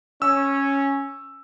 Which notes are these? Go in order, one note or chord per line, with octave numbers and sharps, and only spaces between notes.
C#4 E6